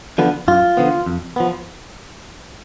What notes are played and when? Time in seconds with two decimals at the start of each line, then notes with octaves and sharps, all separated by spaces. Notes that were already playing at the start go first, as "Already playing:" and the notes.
0.18 D3 F3 B3
0.48 F#2 F4
0.77 D3 F3 B3
1.06 F2
1.36 F3 B3